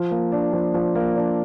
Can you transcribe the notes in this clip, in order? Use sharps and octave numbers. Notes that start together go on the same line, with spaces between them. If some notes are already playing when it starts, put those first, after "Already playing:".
Already playing: F3
A#3
D4
F3
F3
A#3
D4